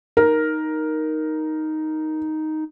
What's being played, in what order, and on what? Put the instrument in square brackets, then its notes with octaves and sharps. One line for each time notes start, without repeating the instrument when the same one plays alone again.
[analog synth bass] D#4 [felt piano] A#4